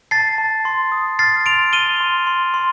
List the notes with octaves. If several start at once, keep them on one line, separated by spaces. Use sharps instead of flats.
A5 A6 C7
A5
C6
D#6
F6 A6 C7
C6 D7 F7
F6 D#7 G7
C6
C6
C6